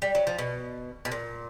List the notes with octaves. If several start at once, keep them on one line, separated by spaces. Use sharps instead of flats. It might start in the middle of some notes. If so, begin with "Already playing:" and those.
G3
F#3
F3
B2
B2
A#2